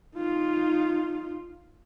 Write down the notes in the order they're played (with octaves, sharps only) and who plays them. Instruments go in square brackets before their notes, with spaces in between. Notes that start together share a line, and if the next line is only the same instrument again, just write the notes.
[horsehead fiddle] D#4 F4